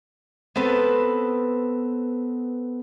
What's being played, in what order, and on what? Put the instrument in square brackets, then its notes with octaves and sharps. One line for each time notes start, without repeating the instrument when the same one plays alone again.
[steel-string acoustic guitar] B3 C4 A4 B4